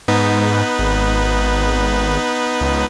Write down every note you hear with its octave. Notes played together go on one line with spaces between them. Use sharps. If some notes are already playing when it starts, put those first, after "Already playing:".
G#2 B3 D#4 B4
G#1
C#2